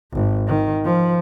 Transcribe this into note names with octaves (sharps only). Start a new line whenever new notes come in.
G#1
D#3
F3